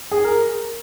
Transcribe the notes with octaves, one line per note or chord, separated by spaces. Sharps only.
G#4
A#4